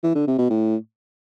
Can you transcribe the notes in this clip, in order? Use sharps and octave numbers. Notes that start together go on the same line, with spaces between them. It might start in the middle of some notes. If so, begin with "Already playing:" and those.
E3
D3
C3
B2
A2